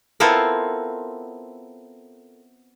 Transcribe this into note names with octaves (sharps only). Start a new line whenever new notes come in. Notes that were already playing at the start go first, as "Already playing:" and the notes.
B3 C4 E4 F4 A4 A#4